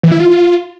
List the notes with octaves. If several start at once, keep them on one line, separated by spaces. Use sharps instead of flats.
E3
E4
F4